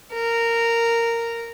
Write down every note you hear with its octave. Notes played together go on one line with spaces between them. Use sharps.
A#4